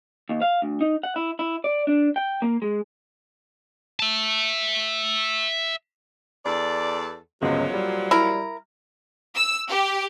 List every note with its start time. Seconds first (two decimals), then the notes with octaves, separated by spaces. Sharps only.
0.29 D#2
0.42 F5
0.62 D2
0.81 D#4
1.03 F#5
1.16 E4
1.39 E4
1.64 D5
1.87 D4
2.16 G5
2.42 A#3
2.62 G#3
4.00 E5 A5
6.45 E2 A4 D5
7.42 G1 C#2 A#2 F3 F#3 D#5
7.74 G3
8.11 E4 A#4
9.35 E6
9.69 G4